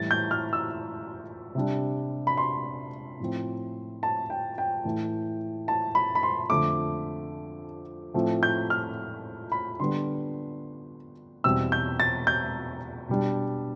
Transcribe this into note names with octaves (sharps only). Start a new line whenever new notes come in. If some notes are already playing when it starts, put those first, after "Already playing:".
Already playing: A2 E3 G3 A6
G6
F6
E6
C3 G3 D4
B5
C6
A2 F3 C4
A5
G5
G5
A2 E3 A3 E4
A5
B5
B5
C6
F2 D3 A3 D6
A2 F3 A3 C4
G6
F6
B5
D3 G3 B3 D4 C6
E2 B2 G3 C4 E4 E6
G6
A6
G6
B2 G3 D4